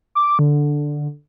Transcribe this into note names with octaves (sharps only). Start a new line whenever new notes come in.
D6
D3